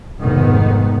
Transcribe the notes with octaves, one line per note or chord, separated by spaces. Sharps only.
F1 G#2 D#3 B3